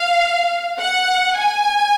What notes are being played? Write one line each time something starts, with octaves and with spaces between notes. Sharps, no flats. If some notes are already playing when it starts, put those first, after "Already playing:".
Already playing: F5
F#5
G#5